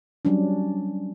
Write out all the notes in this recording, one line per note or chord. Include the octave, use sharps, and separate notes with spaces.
F#3 G3 C#4 D4